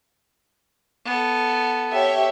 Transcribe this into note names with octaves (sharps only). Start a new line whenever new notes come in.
B3 A4
G4 C#5 E5